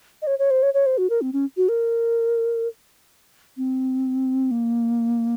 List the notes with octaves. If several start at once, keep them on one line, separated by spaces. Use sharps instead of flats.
D#5
C#5
C#5
C5
C#5
C#5
C5
F#4
A#4
C4
C#4
F#4
A#4
C4
A#3